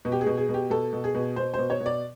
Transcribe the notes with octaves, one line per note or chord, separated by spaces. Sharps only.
B2
G4
G#4
B2
G#4
B2
G4
B2 A4
B2
G#4
B2
B2 C5
B2 C5
C#5
B2
D5